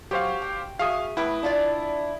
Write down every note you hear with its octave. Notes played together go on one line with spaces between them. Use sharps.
F#3 G4 C5 F5
G5
F#4 G#4 E5 F5 D#6
A2 E4 B4 G5
D4 F4 D5